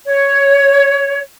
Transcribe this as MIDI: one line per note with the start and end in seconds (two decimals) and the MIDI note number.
0.06 1.20 73